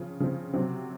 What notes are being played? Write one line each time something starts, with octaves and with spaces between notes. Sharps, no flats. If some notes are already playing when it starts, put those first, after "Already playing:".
Already playing: C#3 F3 C4
C#3 F3 C4
C3 F#3 C4